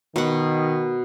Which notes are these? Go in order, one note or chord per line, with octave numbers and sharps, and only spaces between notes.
B2 D#3 F#5